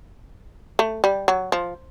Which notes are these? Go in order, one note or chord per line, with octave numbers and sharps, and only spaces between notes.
A3
G3
F#3
F3